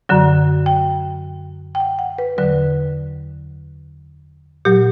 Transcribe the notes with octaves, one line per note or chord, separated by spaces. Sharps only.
F#2 D3 F#3
G5
G5
F#5
F#5
B4
E2 D3 F#3 B4
A#2 F#3 G4